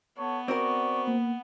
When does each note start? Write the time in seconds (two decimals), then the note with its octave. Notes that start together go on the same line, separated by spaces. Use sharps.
0.18 B3 A4 C#5
0.48 C4 F#4 A#4 D5 C#6
1.08 A#3